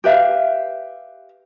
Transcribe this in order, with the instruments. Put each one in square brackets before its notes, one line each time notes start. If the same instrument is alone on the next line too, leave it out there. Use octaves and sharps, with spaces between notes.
[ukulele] G4 B4 E5 F5